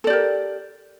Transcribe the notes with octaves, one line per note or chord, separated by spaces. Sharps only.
G4 A4 A#4 D5